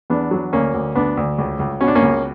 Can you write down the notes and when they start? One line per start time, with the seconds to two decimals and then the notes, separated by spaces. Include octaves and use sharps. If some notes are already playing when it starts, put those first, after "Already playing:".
0.10 E2 B3 D4
0.31 F#3
0.53 D2 A#3 C#4
0.74 D2
0.95 D2 B3 D4
1.17 D2
1.38 C#2
1.59 C#2
1.81 B2 C#4
1.88 D4
1.95 A#3 C#4
2.02 C#2